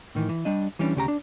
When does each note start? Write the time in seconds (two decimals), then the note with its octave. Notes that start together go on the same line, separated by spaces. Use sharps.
0.15 A2 D#3 E3
0.29 E3
0.45 G3 D4 D#5
0.79 E3 G3 C#4 D4
0.95 D2 C#3 G4 A#5
1.08 D4